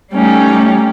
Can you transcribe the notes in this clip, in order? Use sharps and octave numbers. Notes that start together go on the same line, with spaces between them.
G3 A3 C#4 D#4 G4